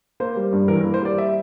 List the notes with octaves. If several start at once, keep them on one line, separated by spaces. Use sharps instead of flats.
A#3 C5
G3
G2
E3 A#4
A#4
A#3
C5
G3 D5
E5